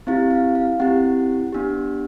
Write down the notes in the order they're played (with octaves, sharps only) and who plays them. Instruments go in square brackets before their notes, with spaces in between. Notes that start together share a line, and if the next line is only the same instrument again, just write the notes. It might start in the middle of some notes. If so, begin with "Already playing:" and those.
[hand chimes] C4 E4 G4 F5
F5
F5
C4 E4 G4 F#5
B3 D4 G4